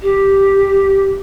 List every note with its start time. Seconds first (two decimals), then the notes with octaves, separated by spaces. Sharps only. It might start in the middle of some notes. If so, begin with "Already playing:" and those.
0.02 G4